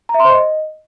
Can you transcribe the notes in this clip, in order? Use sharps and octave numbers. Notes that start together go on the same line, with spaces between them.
A#5
E5
C6
C5
D#5